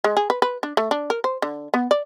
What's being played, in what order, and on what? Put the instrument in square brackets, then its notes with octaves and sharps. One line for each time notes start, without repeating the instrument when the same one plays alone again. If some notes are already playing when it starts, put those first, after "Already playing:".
[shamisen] G#3
G#4
B4
B4
D4
A3
D4
A#4
C5
D3
B3
D5